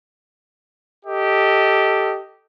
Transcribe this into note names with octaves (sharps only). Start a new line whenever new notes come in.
G4 A4 D#5